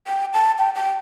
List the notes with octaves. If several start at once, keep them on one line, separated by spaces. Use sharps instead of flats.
G5
A5
G5
G5